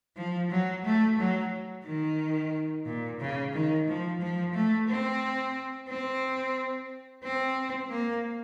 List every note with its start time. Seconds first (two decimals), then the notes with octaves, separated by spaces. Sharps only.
0.16 F3
0.50 F#3
0.84 A3
1.18 F#3
1.85 D#3
2.85 A#2
3.19 C#3
3.53 D#3
3.87 F3
4.20 F3
4.54 A3
4.88 C4
5.88 C4
7.23 C4
7.91 A#3